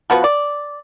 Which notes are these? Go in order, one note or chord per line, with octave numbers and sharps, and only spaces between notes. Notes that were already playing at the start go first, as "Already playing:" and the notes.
F3 B3 F#4 B4
D5